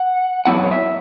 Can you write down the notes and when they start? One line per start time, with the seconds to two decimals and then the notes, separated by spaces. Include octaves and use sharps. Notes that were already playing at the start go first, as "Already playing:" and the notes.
Already playing: F#5
0.45 F#2 F#3 B3 E4 F#5
0.64 C#5
0.71 E5